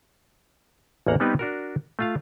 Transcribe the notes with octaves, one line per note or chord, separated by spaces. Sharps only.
A1 E2 A#3 F#5 A#5
G3 B3 C4 D#4 G4 B4
D4 F#4 A#4
A3 F4 F5